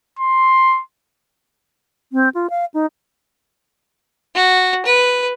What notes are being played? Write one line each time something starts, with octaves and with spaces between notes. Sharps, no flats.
C6
C4
F4
F5
D#4
F#4
B4